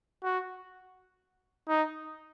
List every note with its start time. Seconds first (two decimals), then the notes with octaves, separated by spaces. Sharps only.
0.24 F#4
1.69 D#4